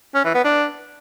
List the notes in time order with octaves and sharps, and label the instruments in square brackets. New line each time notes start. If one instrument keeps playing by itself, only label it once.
[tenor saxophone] C#4
E3
B3
D4